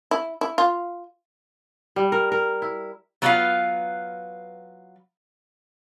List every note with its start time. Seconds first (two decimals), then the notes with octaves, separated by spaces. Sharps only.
0.11 E4
0.41 E4
0.58 F4
1.96 G3
2.12 A#4
2.32 A#4
2.62 E4
3.22 F#3 B3 F4 A4 B4 F5